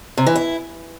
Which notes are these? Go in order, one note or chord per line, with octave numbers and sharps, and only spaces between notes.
C3
E3
E4